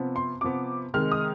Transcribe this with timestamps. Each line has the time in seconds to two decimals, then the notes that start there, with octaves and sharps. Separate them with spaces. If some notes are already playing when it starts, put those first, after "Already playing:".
Already playing: C3 F3 B3
0.16 C6
0.41 C3 F3 B3 D6
0.94 C3 D#3 G#3 F6
1.12 D#6